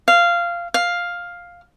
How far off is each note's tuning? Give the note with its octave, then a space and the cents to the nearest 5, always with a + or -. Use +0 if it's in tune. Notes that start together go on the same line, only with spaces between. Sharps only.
F5 -15
F5 +5